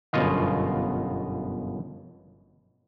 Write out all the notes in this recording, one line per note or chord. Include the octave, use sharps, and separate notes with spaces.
G1 F#2 B2 F4 D#5 F5